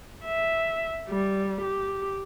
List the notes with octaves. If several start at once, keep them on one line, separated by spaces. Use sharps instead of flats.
E5
G3
G4